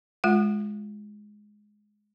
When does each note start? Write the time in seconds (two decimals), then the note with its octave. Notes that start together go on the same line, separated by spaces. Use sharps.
0.24 G#3 F4 F#5